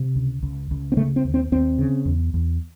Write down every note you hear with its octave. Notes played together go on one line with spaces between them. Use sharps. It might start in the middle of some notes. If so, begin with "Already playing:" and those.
Already playing: C3
C#2
C#2
C#2
C4
C#3 A3
C4
D#2
C4
D#2 C4
C#3
E2
E2